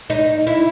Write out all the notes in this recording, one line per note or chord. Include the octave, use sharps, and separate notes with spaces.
D#4
E4